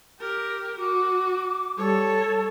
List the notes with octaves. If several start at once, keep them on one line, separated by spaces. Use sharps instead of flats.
G4 A#4
F#4 D6
G3 A4 C#5